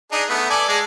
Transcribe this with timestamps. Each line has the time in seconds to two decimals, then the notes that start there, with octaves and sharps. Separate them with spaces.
0.12 D4 D#4 G#4
0.30 A3 B3
0.50 A4 D5 G#5
0.69 G#3 D5